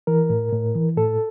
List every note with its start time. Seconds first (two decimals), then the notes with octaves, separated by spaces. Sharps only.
0.07 E3 A#4
0.30 A2
0.52 A2
0.75 E3
0.97 A2 A4